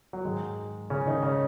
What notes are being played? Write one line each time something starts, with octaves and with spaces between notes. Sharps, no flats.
F#3
G#2 D#3 G#3
C#3 C#4
D#3 D#4
C#3 C#4